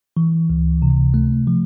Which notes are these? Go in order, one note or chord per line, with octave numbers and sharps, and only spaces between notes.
E3
C#2
C3
A3
F3